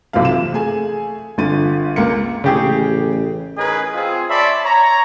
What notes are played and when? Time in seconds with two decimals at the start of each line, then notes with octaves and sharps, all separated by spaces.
0.13 B1 C3 E3 F3 F5
0.25 E7
0.53 A3 G#4 G#5
1.38 G1 D3 F4 A6 D#7
1.96 C#2 G#3 A#3 C#7
2.44 A1 C#3 G4 G#4
3.58 C#4 D#4 G#4 A#4 B4 D#5
3.94 C4 F4 G#4
4.30 C#5 D5 E5 A5 B5 C6
4.64 C#5 A#5